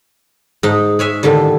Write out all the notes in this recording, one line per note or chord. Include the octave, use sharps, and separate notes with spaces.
G#2 D#4
G#3 C#5 E5 G#5
A2 D3 D#3 G3